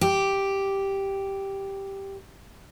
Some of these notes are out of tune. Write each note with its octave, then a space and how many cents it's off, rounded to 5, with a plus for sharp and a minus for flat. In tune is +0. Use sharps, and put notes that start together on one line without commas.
G4 +0